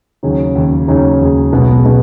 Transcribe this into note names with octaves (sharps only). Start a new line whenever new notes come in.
D#2 C#3 F#3 D#4 G#4
D#2 C#3 F#3 D#4 G#4
D#2 C#3 F#3 D#4 G#4
D#2 C#3 F#3 D#4 G#4
B1 B2 G#3 B3
B2 G#3 B3